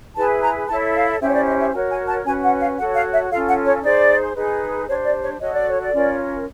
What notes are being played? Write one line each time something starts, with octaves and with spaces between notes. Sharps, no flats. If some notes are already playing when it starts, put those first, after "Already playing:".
E4 G#4 B4 A5
A#5
E4 A4 C#5 A5
F5
C#4 E4 G4 C5 E5
C#5
D5
D#5
E5
F#4 A#4 C#5 G#5
G#5
A5
C#4 F#4 B4 G#5
F#5
F5
F#4 A4 C#5 F#5
F5
E5
C#4 F4 A4 F5
F#5
C#5
D#4 G#4 C5 D5
D#4 G#4 B4
D4 G4 C5 C#5
D5
C#5
F#4 A4 C#5 D#5
D5
C#5
D5
C#4 F4 A#4 C#5